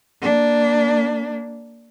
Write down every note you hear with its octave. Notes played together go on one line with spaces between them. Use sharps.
A#3 D4